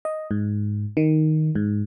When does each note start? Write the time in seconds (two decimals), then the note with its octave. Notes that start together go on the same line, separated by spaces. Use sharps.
0.05 D#5
0.31 G#2
0.97 D#3
1.55 G#2